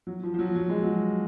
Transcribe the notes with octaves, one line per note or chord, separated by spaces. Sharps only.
F#3
F3
F3
F#3
F#3
G#3
F#3